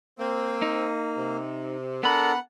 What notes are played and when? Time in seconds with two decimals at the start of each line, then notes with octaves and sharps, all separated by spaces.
0.19 A#3 C4
0.62 D#4
1.17 C3
2.03 B3 D4 A4 A#4 F#5 B5